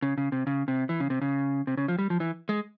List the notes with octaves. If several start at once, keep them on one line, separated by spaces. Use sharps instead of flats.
C#3
C#3
C3
C#3
C3
E3
C#3
C3
C#3
C3
C#3
F3
G3
F3
E3
G#3